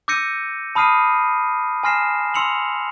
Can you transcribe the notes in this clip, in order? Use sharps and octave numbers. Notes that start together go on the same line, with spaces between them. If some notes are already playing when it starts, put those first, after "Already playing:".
D6 E6 G6 A#6 C#7 D#7
A5 B5 D#6 F6 C7 D#7
G#5 C6 F6 A#6 C7 E7
C6 E6 C#7 F7 F#7